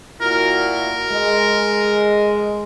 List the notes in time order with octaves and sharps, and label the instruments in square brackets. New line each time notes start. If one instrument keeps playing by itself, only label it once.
[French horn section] A#2 E4 F#4 [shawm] A#4
[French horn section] G#3